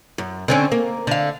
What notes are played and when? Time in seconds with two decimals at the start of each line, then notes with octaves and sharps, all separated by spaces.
0.18 F#2
0.48 D3 C4 C#4
0.72 A#3
1.07 D3 F5